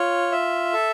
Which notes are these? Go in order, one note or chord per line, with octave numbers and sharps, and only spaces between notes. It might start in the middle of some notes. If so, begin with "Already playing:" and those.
Already playing: F4 C#5
E5
A4